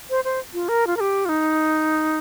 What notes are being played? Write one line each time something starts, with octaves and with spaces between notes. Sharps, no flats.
C5
C5
F4
A#4
F4
A#4
G4
F4
D#4